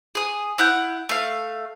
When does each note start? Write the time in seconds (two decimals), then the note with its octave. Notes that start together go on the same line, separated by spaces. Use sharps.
0.15 G#4 D#6
0.58 E4 F#5 F6 G6
1.09 A3 F5